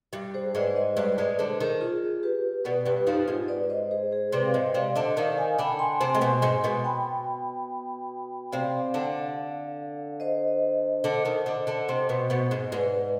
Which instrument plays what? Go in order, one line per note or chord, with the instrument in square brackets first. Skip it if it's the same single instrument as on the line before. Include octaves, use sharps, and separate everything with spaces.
[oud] G2 G3
[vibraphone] G#4 C5
[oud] G#2 G#3 [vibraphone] B4 D5
[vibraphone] C5 D#5
[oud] G2 G3 [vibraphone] B4 D5
[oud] G#2 G#3 [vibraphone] B4 D5
[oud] D3 D4 [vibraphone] G#4 C5
[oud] D#3 D#4
[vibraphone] F4 G#4
G4 B4
[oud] B2 B3 [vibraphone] B4 D5
[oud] G2 G3 [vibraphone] G4 B4
[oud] F2 F3 [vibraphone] D#4 G4
[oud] G#2 G#3 [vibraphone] F4
[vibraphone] B4 D5
C5 D#5
G#4 C5
G#4 C5
[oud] C3 C4 [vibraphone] B4 D5
[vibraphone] F5
[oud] G#2 G#3 [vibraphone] C5 D#5
[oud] C3 C4 [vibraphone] D5 F5
[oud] D3 D4 [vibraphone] C5 D#5
[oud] D#3 D#4 [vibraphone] D5 F5
[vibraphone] F5 G#5
[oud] D3 D4 [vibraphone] G5 B5
[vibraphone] G#5 C6
[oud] C3 C4
G#3
B2 B3
G#2 G#3
B2 B3
[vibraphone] G5 B5
[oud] C3 C4 [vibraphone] D5 F5
[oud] D3 D4
[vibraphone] C5 D#5
[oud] D3 D4
D#3 D#4
D3 D4
D3 D4
C3 C4
B2 B3
B2 B3
G#2 G#3
[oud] G#2 G#3 [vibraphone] B4 D5